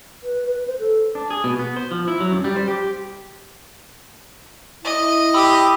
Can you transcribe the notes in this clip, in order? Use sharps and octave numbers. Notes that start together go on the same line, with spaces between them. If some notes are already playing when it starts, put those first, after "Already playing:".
B4
B4
C5
A4
D4
G#4
B2
B3
C5
F3
E4
F#3
F#2
G3
C5
G4
E4 D#5
G4 B5 D#6 E6